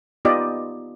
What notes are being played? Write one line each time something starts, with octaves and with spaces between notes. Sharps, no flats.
B3 D#4 F4 G4 D5 D#5